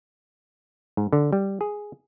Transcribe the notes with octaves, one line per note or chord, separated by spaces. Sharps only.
G#2
D3
G3
G#4